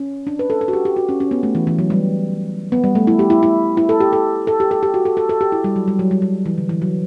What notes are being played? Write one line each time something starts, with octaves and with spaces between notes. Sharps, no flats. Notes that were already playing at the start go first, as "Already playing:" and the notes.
Already playing: C#4
D4
B4
A4
A4
F#4
G4
G4
F#4
C#4
C#4
B3
A3
E3
E3
F#3
G3
B3
G3
A3
E4
G4
E4
E4
E4
A4
G4
A4
A4
G4
A4
G4
F#4
A4
A4
A4
G4
E4
G3
F#3
G3
F#3
G3
G3
E3
D3
E3
F#3